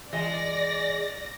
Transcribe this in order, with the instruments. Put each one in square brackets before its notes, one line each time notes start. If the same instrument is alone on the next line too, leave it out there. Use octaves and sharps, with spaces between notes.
[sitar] E3 G#3 D#5 [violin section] D5 A#6